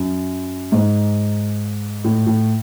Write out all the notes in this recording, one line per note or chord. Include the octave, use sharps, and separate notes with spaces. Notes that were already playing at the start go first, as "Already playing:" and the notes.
Already playing: F#2
G#2
A2
A2